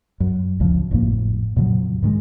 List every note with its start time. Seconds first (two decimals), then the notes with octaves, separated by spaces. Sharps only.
0.20 F#2
0.60 G#1 D2 C#3 F3
0.91 G#1 F2 A2 A#3
1.56 F2 A#2 C#3 F#3
2.02 G#2 D#3 G3 G#3